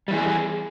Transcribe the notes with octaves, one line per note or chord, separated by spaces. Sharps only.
E3 G3 G#4